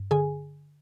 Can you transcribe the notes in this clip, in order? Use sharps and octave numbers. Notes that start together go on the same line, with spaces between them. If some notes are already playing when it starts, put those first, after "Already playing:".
Already playing: G2
D3 G#4 G#5